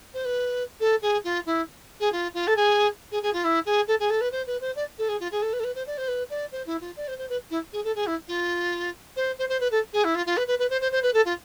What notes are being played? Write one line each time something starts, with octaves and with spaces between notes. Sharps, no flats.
C5
B4
A4
G#4
F4
E4
G#4
F4
F4
A4
G#4
G#4
G#4
F4
E4
G#4
A4
G#4
A4
B4
C5
B4
C5
D5
A4
G#4
F4
G#4
A4
B4
A4
B4
C5
D5
C5
B4
D5
C5
E4
F4
D5
C5
C5
B4
E4
G#4
A4
G#4
E4
F4
C5
C5
C5
B4
A4
G#4
E4
F4
F4
B4
B4
B4
C5
C5
C5
B4
A4
F4